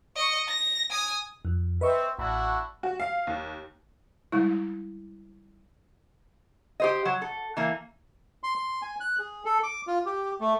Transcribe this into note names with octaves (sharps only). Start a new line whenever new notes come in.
D#5 C#6
A#6
G#5 D#6
F2
C4 B4 D#5 E5 C#6
A1 D4 E4 F#4 B5
F#4
F5
D#2
G3 G#3 E4
G4 C5 D#5
F#3
A4
E3 A#3
C6
C6
G#5
F#6
G#4
A4
D6
F4
G4
A3